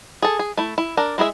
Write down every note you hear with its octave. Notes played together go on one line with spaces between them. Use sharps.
G#4 A4
G#4
A3 E4
E4
D4 A#4
G#3 E4 G#4 E5